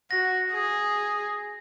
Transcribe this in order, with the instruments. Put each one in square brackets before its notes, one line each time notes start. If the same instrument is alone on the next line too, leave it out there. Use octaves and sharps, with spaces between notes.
[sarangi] F#4 [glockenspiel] A#6
[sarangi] G#4